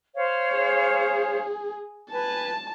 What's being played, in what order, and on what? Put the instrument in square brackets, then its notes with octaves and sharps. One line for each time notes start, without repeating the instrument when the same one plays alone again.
[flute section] C5 C#5 F5
[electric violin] G#4
[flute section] B4 G#5 [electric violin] A5